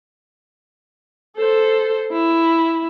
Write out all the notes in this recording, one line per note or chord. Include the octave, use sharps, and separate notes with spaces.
A4 C5
E4